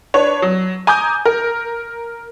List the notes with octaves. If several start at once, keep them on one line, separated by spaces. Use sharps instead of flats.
D4 B4 C#5
F#3
G#5 A#5 D6 D#6 G6
A#4